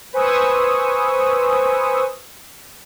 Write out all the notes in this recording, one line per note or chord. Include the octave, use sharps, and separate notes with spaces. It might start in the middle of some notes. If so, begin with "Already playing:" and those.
B4 C5 G#5 C#6 D#6 E6